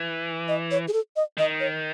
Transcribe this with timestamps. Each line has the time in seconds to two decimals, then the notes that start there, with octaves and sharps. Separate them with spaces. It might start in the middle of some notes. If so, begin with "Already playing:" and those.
Already playing: E3
0.48 D#5
0.71 C#5
0.88 G#4
0.93 A4
1.16 D#5
1.37 D#3 D#5
1.60 C#5